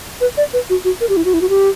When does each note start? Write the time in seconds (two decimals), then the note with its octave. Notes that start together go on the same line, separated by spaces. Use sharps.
0.21 B4
0.37 D5
0.53 B4
0.70 F#4
0.85 F#4
1.01 A#4
1.09 G4
1.17 E4
1.25 F#4
1.34 E4
1.41 F#4
1.49 G4